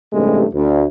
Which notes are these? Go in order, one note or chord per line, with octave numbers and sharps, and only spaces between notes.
A1 G2 C3 G#3 A3
D2